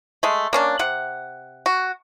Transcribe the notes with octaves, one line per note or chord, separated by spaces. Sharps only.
G#3 A3
A#3 C#4 D4
C3 F#5
F#4